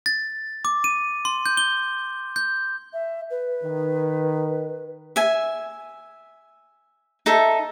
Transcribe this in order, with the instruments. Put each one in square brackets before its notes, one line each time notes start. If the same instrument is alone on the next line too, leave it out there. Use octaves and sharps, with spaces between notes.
[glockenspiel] A6
D6
D#7
C6
G6
G7
G6
[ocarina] E5
B4
[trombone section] D#3
[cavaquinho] E5 G#5
D#4 A4 E5